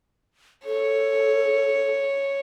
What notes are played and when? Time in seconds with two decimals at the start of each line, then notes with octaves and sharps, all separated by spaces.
0.66 A4 C#5